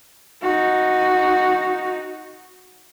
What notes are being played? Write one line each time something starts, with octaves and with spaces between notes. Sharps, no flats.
D#4 F#4